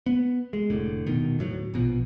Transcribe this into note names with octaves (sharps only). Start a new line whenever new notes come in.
B3
G#3
F1 A2 D3
D#1 B2 D#3
D2 A2 F#3
A#1 B2 F3